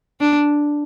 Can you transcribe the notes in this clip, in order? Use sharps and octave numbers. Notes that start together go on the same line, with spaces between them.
D4